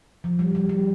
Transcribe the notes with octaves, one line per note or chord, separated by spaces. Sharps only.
F3
G3
G3
G3